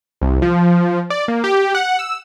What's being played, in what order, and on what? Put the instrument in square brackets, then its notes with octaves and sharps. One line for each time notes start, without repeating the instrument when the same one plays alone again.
[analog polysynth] C2
F3
D5
A#3
G4
F#5
E6